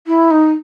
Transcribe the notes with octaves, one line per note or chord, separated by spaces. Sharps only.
E4
D#4